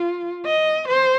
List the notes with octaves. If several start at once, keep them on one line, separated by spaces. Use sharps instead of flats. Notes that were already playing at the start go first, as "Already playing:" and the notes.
Already playing: F4
D#5
C5